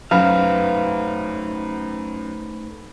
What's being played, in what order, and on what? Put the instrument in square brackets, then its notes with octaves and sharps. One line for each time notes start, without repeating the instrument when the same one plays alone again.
[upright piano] F#2 [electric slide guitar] A3 D#4 C5 [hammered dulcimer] B4 [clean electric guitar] F5